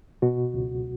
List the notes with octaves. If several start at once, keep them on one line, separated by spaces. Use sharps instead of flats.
B2 F#4
C#2